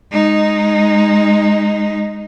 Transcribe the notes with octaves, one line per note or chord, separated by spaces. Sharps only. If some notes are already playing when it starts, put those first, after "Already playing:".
G#3 D#4